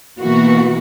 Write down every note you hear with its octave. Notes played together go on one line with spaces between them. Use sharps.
B2 E3 A#3 F#4